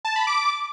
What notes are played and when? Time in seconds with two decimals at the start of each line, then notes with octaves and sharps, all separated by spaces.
0.05 A5
0.16 B5
0.27 D6